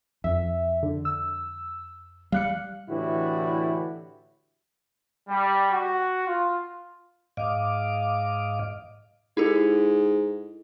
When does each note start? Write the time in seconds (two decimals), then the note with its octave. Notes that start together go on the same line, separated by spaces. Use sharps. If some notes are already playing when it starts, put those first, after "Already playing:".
0.24 F2 E5
0.83 D3
1.05 E6
2.32 G3 F5 F#6 C#7
2.89 A2 D3 E3 E4 F#4 G4
5.29 G3
5.72 F#4
6.27 F4
7.37 G#2 D#5 F5 D6
9.37 G#2 E4 G4 A4